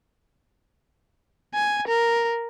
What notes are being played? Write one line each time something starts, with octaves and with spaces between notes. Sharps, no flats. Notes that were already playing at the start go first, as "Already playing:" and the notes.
G#5
A#4